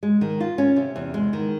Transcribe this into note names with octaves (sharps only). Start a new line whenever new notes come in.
G#3
D#3
F4
C#4
C3
E2
G#3
D#3